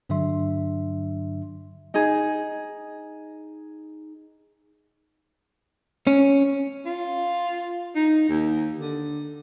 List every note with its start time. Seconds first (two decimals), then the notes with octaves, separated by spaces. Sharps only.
0.09 G2 D3 F#3 D4 E5 C6
1.94 D#4 G#4
6.07 C#4
6.86 F4
7.95 D#4
8.29 D#2
8.79 D3